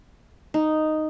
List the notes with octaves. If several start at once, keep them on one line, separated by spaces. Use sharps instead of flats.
D#4